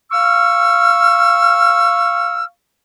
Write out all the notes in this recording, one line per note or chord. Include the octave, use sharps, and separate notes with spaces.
F5 C#6 E6 F6